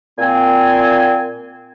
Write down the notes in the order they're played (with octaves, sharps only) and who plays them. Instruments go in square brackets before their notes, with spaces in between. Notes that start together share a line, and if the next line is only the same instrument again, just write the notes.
[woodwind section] A#2 C4 G#5